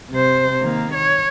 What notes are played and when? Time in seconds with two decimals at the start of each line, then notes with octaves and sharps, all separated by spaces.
0.10 C3 C5
0.61 D#3 A#3
0.94 C#5